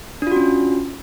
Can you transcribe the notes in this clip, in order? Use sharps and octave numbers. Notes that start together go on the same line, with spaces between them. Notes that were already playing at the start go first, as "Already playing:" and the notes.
C#4 D4 F4 F#4